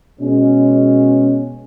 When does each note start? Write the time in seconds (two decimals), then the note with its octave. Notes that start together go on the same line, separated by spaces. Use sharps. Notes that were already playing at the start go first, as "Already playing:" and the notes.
0.20 B2 G#3 C#4